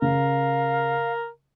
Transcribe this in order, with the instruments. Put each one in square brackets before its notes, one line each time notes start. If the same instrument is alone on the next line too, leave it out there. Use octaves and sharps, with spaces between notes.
[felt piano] C#3 [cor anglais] A#4 [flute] F5